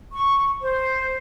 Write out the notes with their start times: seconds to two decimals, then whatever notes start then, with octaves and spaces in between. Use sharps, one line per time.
0.14 C#6
0.62 C5